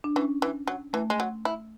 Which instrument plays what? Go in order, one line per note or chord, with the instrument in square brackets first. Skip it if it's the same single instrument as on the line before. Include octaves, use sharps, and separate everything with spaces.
[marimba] D4
[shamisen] E3 [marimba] C#4
[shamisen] E3
F#3
[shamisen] E3 [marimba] A3
[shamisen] G#3
F#3
E4